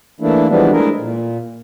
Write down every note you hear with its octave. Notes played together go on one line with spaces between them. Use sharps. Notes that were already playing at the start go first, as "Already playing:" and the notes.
E3 A3 A#3 D4 E4
E3 F3 G3 G#3 B3 D4
G#3 A3 D4 E4 G#4 A#4
A#2